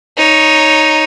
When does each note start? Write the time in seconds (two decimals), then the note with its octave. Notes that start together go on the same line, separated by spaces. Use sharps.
0.17 D#4 C#5